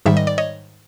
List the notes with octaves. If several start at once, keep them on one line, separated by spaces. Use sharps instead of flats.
G#2 D#3 G3 E5
D#5
D5
C#5 D#5